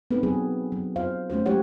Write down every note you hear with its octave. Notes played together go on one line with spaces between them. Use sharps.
B3 C4 D#4 A4 B4
F#3 G#4
F#3
F4 C5 F5
A3 C#4 F#4 C5
F#3 G#3 C#4 G4 C#5 F#5